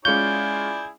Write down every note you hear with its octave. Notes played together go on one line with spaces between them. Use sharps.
G#3 C#4 E4 F4 G#4 D5 G6